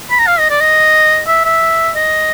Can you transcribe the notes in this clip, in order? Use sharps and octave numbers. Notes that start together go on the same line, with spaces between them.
B5
A#5
F5
D#5
D5
D#5
E5
E5
D#5